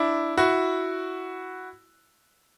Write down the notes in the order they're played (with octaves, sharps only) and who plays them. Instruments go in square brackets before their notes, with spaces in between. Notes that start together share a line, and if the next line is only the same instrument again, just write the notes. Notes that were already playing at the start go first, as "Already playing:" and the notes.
Already playing: [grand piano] D4 E4
E4 F#4